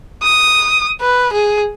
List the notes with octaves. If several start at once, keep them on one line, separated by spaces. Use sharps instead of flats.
D#6
B4
G#4